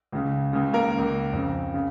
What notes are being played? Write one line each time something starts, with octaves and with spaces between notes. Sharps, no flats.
C#2 C#3
C#2 C#3
A#3 A#4
C#2 C#3
F2 C#3
C#3